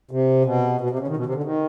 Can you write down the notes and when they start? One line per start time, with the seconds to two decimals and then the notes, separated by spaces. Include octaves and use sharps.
0.11 C3
0.45 B2
0.80 B2
0.90 C3
0.99 C#3
1.08 D#3
1.17 B2
1.26 C3
1.34 D3
1.43 D#3